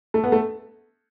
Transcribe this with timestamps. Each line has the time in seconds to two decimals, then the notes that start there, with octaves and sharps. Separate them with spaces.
0.14 A3
0.24 B3
0.32 A3